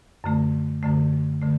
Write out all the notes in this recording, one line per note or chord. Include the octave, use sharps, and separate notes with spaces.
F#2 D3 A3
F#2 D3 A3
D3 A3